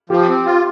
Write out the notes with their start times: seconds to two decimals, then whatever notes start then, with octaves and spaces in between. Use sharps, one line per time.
0.10 F3 G4
0.28 C4
0.45 F4